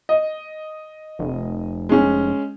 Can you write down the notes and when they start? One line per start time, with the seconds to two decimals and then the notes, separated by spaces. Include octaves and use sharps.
0.09 D#5
1.19 F1
1.89 G#3 C#4